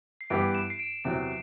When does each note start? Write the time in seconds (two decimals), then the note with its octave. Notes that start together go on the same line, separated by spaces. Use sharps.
0.21 C7
0.30 G2 E3 B3 E4 G4 D7
0.55 E7
0.70 C7
0.79 D7
1.04 E2 C3 F#3 D7